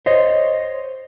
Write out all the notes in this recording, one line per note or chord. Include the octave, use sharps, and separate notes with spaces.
C5 C#5 D#5